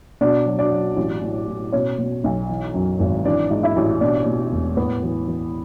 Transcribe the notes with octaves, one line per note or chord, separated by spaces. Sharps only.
B2 D4 D5
F#3
D4 D5
F#3
A1
A2
A2
B2 C#4 C#5
B2
B1
E3
F#2
G#1
E3 D4 D5
G#2
E4 E5
A1
B2 D4 D5
B2
E1
A2 B3 B4
E3
E3